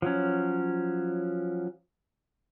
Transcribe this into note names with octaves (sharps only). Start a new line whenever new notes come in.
F3 F#3 C#4